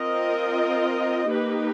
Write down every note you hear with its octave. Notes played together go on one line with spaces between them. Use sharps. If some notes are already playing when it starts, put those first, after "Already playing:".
Already playing: C4 F4 A#4 D#5
A#3 D#4 G4 B4